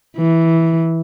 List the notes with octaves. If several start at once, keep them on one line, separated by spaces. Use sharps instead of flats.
E3